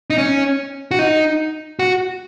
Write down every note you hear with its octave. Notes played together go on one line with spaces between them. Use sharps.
D#4
C#4
F#4
D#4
F#4